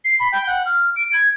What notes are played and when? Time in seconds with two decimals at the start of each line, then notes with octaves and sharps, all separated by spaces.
0.05 C7
0.20 B5
0.32 G5
0.47 F#5
0.66 F6
0.96 D7
1.13 G#6